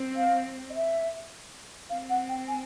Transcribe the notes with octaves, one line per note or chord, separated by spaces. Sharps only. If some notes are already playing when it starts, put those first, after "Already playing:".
Already playing: C4
F5
D#5
E5
C4 F5
F#5
G5
G#5